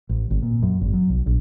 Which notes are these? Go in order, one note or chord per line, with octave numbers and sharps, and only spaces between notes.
A1
G#1
A#2
F#2
G#1
F#3
B1
A#1